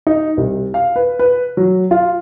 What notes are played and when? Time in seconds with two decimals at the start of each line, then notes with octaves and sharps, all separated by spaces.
0.07 D#4
0.37 C2
0.74 F5
0.96 B4
1.19 B4
1.57 F#3
1.91 F4